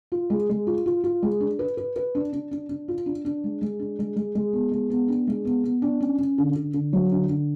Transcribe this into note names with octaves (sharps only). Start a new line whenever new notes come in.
F4
G#3
G#3
F4
F4
F4
G#3
D4
B4
B4
B4
D4
D4
D4
D4
F4
D4
D4
G#3
G#3
D4
G#3
G#3
G#3
B3
G#3
B3
D4
G#3
B3
B3
D4
C#4
C#4
D3
D3
D3
F#3
D3
D3